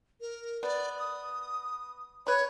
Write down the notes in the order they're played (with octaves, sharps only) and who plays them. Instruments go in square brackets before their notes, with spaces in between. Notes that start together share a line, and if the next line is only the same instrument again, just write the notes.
[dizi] A#4
[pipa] B3 [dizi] D5
[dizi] D#6
[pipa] B4 B5 [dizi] C#5